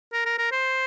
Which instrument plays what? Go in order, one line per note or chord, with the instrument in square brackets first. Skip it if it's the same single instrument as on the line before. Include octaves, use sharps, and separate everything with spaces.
[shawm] A#4
A#4
A#4
C5